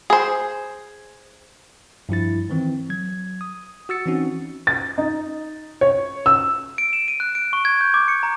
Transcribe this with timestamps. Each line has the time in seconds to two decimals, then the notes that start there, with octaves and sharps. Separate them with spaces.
0.10 G#4 C5
2.09 G2 F3 E4 A6
2.50 D#3 E3 C4
2.90 F#3 G#6
3.41 D#6
3.89 F#4 E6 A6 C#7
4.06 E3 C4 C#4 D#4 F#4
4.67 A6
4.98 D#4
5.81 C#5
6.26 E6
6.78 D7
6.93 E7
7.08 D#7
7.20 F#6
7.35 D7
7.53 C#6
7.65 G#6
7.81 G6
7.94 D6
8.08 C#7
8.23 A#5